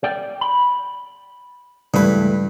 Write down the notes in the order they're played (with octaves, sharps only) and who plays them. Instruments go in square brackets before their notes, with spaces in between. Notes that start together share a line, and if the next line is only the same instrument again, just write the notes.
[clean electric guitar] D5 G5
B5
[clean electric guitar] C#2 E3 A3 [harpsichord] G2 B4